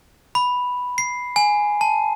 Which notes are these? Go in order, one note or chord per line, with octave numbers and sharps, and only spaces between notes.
B5
C7
G#5
A5